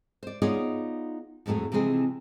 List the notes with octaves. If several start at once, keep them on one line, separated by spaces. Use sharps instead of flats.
C5 D5
B3 D#4 F4 G#4 C#5 D5
F2 A2 F#3 A3 G#4
C3 E3 F3 G#3 C4 G#4